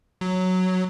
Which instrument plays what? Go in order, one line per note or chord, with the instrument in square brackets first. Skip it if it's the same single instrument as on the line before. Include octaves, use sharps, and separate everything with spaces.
[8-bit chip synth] F#3